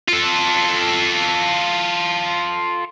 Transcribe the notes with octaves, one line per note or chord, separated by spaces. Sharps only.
F4 A4